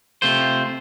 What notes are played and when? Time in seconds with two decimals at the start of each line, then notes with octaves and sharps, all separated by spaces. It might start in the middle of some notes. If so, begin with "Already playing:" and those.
0.22 C3 A3 F4 C5